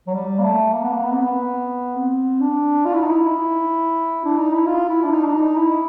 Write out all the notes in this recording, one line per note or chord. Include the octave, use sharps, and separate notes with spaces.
F#3
G3
A#3
A3
A#3
B3
A#3
B3
C4
B3
C4
D4
F4
E4
D#4
E4
D4
D#4
E4
F4
E4
D4
D#4
D4
D#4
E4